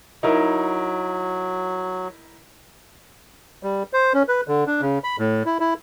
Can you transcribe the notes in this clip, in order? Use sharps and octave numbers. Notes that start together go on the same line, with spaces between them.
F#3 D#4 E4 A#4
G3
C5
C#4
B4
D3
D4
C#3
B5
A2
E4
E4